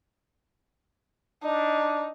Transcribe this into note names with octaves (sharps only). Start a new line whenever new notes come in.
D4 D#4